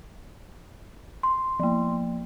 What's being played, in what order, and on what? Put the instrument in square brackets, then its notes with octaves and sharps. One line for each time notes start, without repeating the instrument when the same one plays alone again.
[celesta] C6
[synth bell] F3 A#3